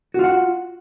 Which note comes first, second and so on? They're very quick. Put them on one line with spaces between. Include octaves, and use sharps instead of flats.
F#4 F4 F#5